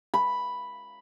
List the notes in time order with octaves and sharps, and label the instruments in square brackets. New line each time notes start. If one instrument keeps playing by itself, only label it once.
[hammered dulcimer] B5